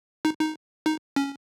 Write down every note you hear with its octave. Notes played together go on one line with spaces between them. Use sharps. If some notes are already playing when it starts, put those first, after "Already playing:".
D#4
D#4
D#4
C#4